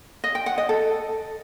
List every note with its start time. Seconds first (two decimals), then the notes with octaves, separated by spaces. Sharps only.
0.24 D#5
0.35 G5
0.46 F#5
0.58 D#5
0.69 A4